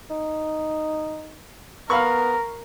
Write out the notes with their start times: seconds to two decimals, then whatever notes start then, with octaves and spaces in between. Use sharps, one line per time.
0.10 D#4
1.90 B3 A#4 F5 B5 C#6